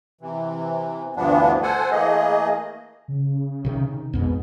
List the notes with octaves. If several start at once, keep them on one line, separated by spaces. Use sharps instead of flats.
C3 E3
D2 G2 E3 F3 B3 D4
A4 C5 F#5 G#5
E3 A3 A#3 G#4 D#5
C#3
C3 D#3
F2 G#2 B2 B3